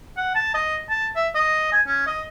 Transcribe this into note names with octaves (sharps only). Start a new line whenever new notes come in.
F#5
A5
D#5
A5
E5
D#5
G#5
C#4
D#5